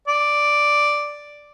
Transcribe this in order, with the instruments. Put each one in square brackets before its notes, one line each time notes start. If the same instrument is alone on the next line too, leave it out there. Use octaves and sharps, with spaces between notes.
[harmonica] D5